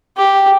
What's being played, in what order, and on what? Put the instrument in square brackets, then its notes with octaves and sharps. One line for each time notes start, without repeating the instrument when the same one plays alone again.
[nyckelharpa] G4